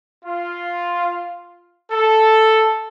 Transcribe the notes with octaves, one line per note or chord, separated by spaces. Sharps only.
F4
A4